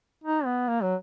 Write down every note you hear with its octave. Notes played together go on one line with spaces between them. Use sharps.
D#4
B3
A#3
F#3